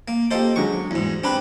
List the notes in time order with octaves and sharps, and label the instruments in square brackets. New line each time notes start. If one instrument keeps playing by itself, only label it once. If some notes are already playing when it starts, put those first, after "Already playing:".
[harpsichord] A#3
[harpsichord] A#3 A4 C5 [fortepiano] G4 D#5
[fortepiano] D3 F#3 G#3 [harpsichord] C#6
[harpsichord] E2 G#2
[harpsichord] C4 G4 B4 [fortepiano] D4 B5